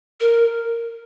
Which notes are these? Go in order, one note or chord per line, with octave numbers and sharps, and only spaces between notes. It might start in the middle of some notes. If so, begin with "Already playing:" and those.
A#4